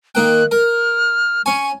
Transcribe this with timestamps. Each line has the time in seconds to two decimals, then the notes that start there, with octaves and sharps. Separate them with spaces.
0.15 D#3 A#3 G5 F#6
0.51 A#4 F6
1.46 C#4 G#5 C#6